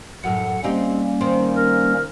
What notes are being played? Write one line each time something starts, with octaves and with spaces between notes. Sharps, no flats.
F#2 A2 F#5
G3 A#3 C4 C#4 D#4 G4
D#3 C4
A#4